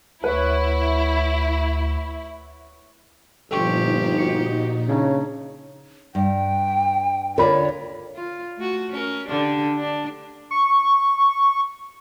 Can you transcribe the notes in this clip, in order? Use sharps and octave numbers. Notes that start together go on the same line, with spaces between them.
D2 E4 B4 C#5 F#5
G1 A#2 F3 D#4 G4 A4 G5 C#6
F#4 C#7
C#3 D4 D#4 C#5
G2 G5
D3 F4 A#4 C#5 D5 B5
F4
A3 F#4
C#4 A#4
D3 D4 G4
D4
C#6